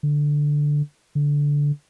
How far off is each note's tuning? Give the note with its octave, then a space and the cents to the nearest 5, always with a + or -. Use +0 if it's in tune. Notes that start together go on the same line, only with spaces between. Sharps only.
D3 +0
D3 -15